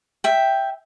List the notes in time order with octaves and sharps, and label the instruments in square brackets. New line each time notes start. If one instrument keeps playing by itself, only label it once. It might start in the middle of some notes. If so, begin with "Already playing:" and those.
[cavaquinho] E5 G5